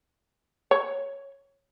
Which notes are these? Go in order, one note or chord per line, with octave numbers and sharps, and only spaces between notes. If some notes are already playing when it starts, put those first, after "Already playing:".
C#5